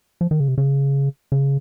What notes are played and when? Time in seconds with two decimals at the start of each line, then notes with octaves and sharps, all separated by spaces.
0.21 F3
0.31 D#3
0.40 C#3
0.48 C3
0.58 C#3
1.32 C#3